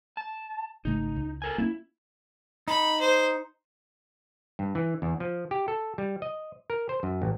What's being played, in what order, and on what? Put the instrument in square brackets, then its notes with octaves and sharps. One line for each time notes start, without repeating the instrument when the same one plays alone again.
[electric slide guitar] A5
[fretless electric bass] G#1 C#3 A3 [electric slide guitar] D#4
[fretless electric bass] C#2
[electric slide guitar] A4 A#4 G#5
[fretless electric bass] A#3 B3 C#4 [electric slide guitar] E4
[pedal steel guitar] D#4 [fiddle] B5
[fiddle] C5
[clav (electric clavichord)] G2
E3
E2
F3
G4
A4
G3
D#5
A#4
C5
F#2
A1